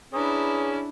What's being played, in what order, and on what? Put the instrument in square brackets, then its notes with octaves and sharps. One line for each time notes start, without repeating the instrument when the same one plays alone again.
[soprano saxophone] C#4 [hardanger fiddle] D4 E4 [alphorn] G#4 [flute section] B4 A#5 D#6